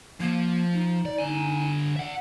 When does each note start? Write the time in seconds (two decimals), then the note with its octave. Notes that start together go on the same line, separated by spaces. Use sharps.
0.20 F3 A#3
0.73 D#4
1.05 D5
1.18 D3 G#5
1.96 E5 F#5